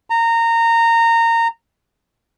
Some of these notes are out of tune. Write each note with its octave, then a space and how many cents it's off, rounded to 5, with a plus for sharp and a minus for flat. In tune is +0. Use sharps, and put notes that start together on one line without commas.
A#5 -20